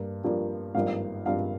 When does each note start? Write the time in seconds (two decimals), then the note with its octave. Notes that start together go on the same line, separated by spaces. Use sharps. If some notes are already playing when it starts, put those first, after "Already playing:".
Already playing: G2 A#3
0.24 G2 F3 A#3 D4
0.75 G#1 G2 F3 A#3 D4 F5
1.25 G#1 G2 F3 A#3 D4 F5